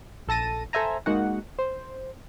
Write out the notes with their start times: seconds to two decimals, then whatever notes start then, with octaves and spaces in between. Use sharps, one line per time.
0.27 A#1 A4 A5 A#6 D#7
0.73 A4 C5 E5 G#5 A#5
1.06 G#3 A#3 D#4 F#4 F#5
1.59 C5